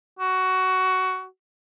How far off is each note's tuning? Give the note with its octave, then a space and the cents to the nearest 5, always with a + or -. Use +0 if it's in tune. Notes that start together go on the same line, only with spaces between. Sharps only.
F#4 +15